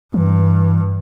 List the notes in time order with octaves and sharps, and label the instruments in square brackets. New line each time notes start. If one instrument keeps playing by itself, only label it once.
[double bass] G2 [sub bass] E3